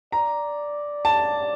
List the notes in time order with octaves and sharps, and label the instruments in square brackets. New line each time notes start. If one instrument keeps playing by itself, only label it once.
[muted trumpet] D5 [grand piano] A#5
[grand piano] A5